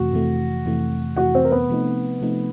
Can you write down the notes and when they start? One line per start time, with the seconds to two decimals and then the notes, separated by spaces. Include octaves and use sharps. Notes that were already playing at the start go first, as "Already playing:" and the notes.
Already playing: F2 C3 E3 A3 F#4
0.13 F2 C3 E3 A3
0.65 F2 C3 E3 A3
1.16 F2 C3 E3 A3 F#4 F#5
1.35 C4 C5
1.45 A#4
1.51 B3 B4
1.69 C3 F3 A3 C4 D#4
2.21 C3 F3 A3 C4 D#4